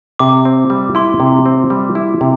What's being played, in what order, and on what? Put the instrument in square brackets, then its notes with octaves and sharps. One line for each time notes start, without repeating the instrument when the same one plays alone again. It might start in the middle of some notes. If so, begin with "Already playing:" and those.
[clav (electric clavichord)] C3 [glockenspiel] D6
[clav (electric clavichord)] C4
G3
[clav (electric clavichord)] E4 [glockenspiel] C6
[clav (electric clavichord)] C3
C4
G3
E4
C3